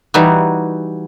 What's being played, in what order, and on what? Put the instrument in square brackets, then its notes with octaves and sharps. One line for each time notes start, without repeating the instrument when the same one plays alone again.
[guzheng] E3 G3 D#4 F#4